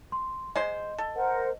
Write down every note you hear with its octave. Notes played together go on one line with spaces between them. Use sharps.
C6
G#3 C5 D#5 C6
A4
A#4 C5 F#5